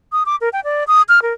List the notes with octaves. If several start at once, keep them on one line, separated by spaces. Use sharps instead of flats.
D#6
D6
A#4
G5
D5
D#6
F6
A#4